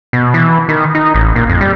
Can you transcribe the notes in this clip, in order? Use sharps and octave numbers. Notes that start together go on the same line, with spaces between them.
B2
E3
D#3
D#4
A1
A#2
F2
G3